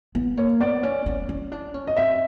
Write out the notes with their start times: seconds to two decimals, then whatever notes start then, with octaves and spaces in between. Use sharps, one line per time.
0.15 B3
0.37 A#3 C#5
0.60 B3 D5
0.83 C#4
1.06 C#4
1.29 C#4
1.52 D4
1.74 C#4
1.87 D#5
1.97 C4 E5